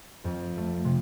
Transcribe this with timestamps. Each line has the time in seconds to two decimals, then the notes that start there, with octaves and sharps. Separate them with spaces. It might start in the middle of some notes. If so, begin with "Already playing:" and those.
0.24 F2
0.57 A3
0.85 C3